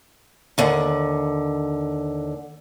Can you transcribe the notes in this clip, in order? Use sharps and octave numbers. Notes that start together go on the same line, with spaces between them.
D#2 D3